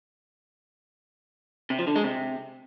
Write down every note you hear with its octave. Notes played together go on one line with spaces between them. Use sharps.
C3
F3
D3
G#3
C3